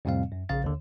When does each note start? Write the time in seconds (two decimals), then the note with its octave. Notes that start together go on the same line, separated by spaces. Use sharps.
0.05 F2 A2 C3 G3 C4 F5
0.32 F#2
0.49 A#1 C#3 F5 A6
0.64 D#2 D3